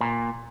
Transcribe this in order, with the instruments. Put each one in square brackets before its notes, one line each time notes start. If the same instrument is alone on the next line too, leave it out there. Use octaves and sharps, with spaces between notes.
[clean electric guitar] A#2